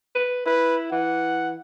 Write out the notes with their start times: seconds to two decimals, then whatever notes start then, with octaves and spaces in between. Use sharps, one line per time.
0.15 B4
0.46 E4 B4
0.92 E3 F#5